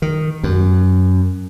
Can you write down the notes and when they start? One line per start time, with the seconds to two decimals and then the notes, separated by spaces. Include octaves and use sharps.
0.02 D#3
0.43 F#2